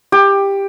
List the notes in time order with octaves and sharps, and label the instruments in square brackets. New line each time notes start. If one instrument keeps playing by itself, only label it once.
[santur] G4